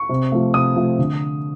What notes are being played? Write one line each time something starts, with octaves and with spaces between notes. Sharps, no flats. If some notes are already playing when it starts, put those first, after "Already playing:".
Already playing: C#6
C3
F3 A3
C3 D#6
F3 A3
D3